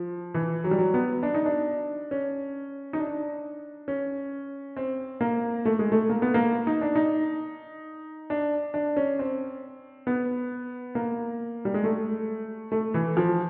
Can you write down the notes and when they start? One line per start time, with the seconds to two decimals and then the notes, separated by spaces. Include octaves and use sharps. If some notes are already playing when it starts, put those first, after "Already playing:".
Already playing: F3
0.34 E3
0.64 F#3
0.71 G3
0.79 F#3
0.94 B3
1.23 D4
1.34 D#4
1.46 D4
2.11 C#4
2.93 D#4
2.99 D4
3.88 C#4
4.77 C4
5.21 A#3
5.65 A3
5.79 G#3
5.92 A3
6.10 A#3
6.22 B3
6.34 A#3
6.67 D#4
6.81 D4
6.95 D#4
8.30 D4
8.74 D4
8.96 C#4
9.19 C4
10.07 B3
10.95 A#3
11.65 G3
11.74 G#3
11.84 A3
12.72 A3
12.94 E3
13.17 F3